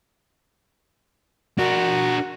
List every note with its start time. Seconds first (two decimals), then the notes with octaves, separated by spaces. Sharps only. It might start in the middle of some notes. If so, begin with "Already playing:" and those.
1.59 D4 F#4 A#4